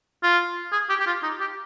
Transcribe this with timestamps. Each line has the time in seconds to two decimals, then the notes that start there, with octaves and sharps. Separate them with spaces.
0.23 F4
0.72 G#4
0.89 G4
1.00 G4
1.07 F4
1.23 D#4
1.41 G4